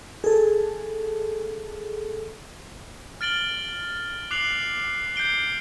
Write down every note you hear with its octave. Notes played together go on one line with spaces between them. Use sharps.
G#4 A4
F6 A6 D7 F#7 G7
D6 F#6 C7 F7 F#7
G6 C7 D7 G7